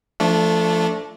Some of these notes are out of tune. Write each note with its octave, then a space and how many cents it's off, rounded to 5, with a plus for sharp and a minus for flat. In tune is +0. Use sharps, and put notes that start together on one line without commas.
F3 -30 A3 +0 D4 -15